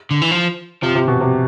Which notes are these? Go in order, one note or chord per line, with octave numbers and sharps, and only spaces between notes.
D3
E3
F3
C3 F3
C3
B2
C3